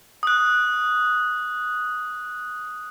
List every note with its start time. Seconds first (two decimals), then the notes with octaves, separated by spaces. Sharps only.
0.23 D#6 F#6